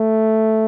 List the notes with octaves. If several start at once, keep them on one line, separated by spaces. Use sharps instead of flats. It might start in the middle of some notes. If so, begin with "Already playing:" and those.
Already playing: A3